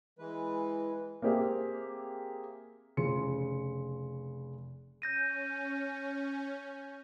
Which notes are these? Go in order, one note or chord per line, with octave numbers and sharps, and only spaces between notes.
E3 G#3 B4
A#3 C4 G4 G#4 E5
F1 C#3 C6 C#7
C#4 G6 A#6 D#7